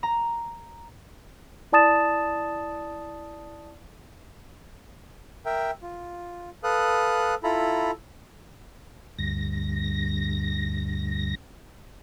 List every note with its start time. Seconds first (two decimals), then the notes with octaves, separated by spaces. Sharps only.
0.03 A#5
1.72 E4 D5 A5 D#6 A6 E7
5.46 A#4 E5 G5
5.82 F4
6.63 A4 B4 F5 D#6 F#6
7.44 E4 F4 A4 A#5 B5
9.18 D2 G2 A#6